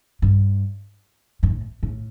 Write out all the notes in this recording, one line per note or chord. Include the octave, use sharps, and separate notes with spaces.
G2
G2
A2
A2